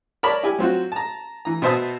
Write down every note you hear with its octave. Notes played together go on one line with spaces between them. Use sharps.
A#4 C#5 D5 A5 B5
E4 G4 G#5
F#3 C4 F4 F#4
A5 A#5
E3 A#5
B2 B3 C5 E5 A5 D#6